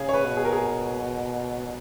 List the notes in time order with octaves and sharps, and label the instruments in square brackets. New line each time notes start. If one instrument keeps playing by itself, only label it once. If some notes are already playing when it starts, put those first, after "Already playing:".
Already playing: [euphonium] C#3 [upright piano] G#4
[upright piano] C#5
B4
[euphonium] B2
[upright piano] G#4
A#4
G#4